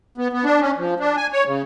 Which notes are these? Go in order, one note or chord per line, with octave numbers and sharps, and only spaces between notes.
B3
B3
D4
C#4
F3
D4
G#5
C#5
C#3